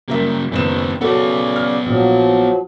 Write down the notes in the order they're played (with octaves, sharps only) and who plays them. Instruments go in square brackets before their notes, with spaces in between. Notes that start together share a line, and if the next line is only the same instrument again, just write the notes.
[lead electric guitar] C#3 A#3 [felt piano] G3 A#4 E5
[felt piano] F#1 B3 E7 [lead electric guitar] D#3 C4
[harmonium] C#3 D5 [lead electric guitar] B3 C#5 [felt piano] F#4 A4 F#5
[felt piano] F6
[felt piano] A#1 [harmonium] F3 F#3